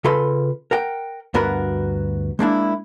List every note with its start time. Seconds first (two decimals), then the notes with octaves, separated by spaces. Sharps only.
0.04 C#3 F4 A4 B4 B5 C6
0.71 A#4 F#5 G5
1.34 D2 G2 B3 F#4 A#4 B5
2.39 G#3 A#3 D4 E4